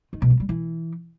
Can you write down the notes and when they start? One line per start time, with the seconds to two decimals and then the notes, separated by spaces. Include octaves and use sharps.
0.13 D#3
0.22 B2
0.31 F#3
0.40 G3
0.49 E3